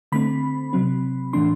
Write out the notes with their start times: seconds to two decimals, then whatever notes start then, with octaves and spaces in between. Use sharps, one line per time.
0.12 D3 A3 C4 B5
0.73 C3 F#3 C4
1.33 A2 E3 A3 D4 C6